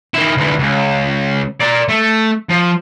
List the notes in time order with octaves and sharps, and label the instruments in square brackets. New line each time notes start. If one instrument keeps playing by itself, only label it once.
[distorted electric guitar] D#3 E4
D2 E3
C#2
A#4 D5
A3
F3